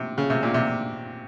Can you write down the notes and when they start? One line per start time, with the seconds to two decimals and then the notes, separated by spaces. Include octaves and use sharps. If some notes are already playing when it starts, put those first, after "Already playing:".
Already playing: C3
0.18 C#3
0.30 C3
0.43 A#2
0.54 C3